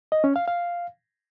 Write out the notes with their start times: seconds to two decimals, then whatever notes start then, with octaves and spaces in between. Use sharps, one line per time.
0.12 D#5
0.24 C#4
0.36 F5
0.48 F5